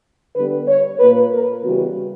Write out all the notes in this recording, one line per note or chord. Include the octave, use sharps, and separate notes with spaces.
D3 G3 B3 B4
C#5
A#2 A#3 B4
A#4
C#3 E3 G3 B3 F#4